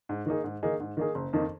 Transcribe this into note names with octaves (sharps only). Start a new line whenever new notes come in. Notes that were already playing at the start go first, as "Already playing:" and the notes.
G#2
D#3 A#3 D#4 G#4
G#2
D#3 A#3 D#4 G#4
G#2
D#3 A#3 D#4 G#4
F#1
F2 D#3 A#3 D#4